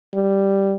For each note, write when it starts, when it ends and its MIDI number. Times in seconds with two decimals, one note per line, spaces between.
0.14 0.75 55